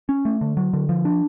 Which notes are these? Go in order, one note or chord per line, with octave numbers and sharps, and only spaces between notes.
C#4
A3
D3
F#3
D3
F3
D4